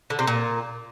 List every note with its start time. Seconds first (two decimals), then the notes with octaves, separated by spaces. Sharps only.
0.10 D3
0.19 C3
0.27 A#2